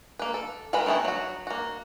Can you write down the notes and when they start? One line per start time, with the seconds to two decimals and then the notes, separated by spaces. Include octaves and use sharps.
0.19 A#3 B4
0.34 A4
0.73 D#3 G#3 A#4 B4 B5
0.86 D#3 E3 A3 B3 E4
1.05 F#3 F#4
1.47 A#3 F#4